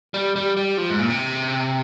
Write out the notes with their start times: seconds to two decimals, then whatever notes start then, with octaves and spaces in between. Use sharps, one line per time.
0.14 G3
0.36 G3
0.57 G3
0.78 F3
0.90 G#2
0.99 A#2
1.10 C3